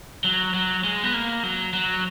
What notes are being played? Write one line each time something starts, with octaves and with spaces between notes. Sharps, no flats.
F#3
F#3
G#3
B3
A#3
F#3
F#3